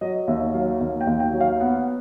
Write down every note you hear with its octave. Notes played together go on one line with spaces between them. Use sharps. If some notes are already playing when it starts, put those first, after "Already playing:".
F#3 D#5
D#2 E5
F#3 F5
D#2
G5
D#2
G5
F#3
F5
B3 F#5